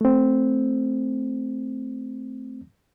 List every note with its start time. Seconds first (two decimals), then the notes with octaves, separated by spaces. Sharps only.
0.01 A3 C4